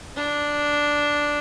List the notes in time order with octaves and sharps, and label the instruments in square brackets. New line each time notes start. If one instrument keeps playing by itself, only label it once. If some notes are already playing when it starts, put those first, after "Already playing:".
[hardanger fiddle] D4